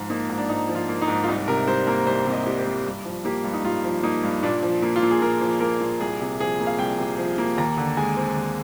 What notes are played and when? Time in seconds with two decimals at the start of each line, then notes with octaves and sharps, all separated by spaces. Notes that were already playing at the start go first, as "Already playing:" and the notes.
Already playing: G#2 F3 F4
0.10 A#3 D#4
0.30 G#2
0.38 D4
0.49 G#2 D#4
0.69 F3
0.75 F4
0.89 A#3
1.01 D#4
1.08 G#2
1.23 F4
1.28 C2 D#4
1.48 C3 A#4
1.68 G3 C5
1.87 A#3 A#4
2.07 C2 C5
2.26 C3
2.33 D#5
2.46 G3
2.59 C5
2.66 A#3
2.86 G2
3.05 F3
3.25 A#3 G4
3.44 G2
3.53 D#4
3.64 G2 F4
3.84 F3
4.03 A#3 D#4
4.23 G2
4.43 A#2 D4
4.63 F3
4.82 A#3
4.96 F4
5.03 A#2
5.11 G#4
5.21 A#2 A#4
5.41 F3
5.60 A#3 A#4
5.81 A#2
6.00 C2 G#4
6.21 C3
6.40 F3 G#4
6.60 A#3
6.67 F5
6.79 C2 G5
6.99 C3
7.18 F3
7.38 A#3
7.58 D#2 A#5
7.77 D3
7.97 G#3 G#5
8.17 C4
8.36 D#2